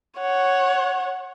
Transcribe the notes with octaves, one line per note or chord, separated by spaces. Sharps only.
C#5 F#5